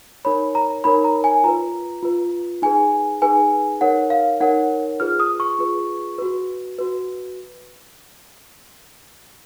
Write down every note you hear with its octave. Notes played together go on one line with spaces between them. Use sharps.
D#4 A#4 C#5 B5
A#5
D#4 A#4 C#5 B5
A#5
G#5
F4 B4 A#5
F4 B4
D#4 G#4 B4 G#5
D#4 G#4 B4 G#5
D#4 A#4 C#5 F#5
F5
D#4 A#4 C#5 F#5
F4 G#4 B4 F6
D#6
C#6
F4 G#4 B4
F#4 B4
F#4 B4